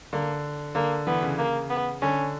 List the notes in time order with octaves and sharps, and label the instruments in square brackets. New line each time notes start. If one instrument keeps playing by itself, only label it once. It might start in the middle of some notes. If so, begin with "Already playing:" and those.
[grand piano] D3 [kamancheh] A#3
[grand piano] D3 [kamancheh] A#3
[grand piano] E3 [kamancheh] B3
[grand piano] C#3
[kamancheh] A#3
B3
[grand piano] D3 [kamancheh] C#4